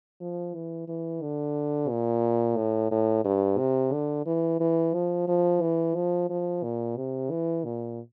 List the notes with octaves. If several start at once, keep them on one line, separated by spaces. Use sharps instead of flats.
F3
E3
E3
D3
A#2
A2
A2
G2
C3
D3
E3
E3
F3
F3
E3
F3
F3
A#2
C3
E3
A#2